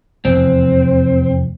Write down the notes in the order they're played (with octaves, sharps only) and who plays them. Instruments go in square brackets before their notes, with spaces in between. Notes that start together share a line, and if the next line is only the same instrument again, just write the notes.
[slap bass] F1 E2 [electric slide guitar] C4